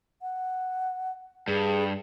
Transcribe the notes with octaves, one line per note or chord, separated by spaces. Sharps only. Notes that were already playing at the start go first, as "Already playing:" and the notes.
F#5
G2 G#4